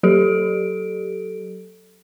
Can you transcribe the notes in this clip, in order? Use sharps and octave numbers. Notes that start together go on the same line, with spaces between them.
F#3 G4 A4 D7